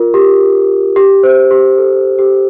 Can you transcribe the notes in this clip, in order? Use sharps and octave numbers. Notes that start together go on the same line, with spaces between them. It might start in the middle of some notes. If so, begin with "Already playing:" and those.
Already playing: F4 A#4
G4
G4
C5
G4
A4
G4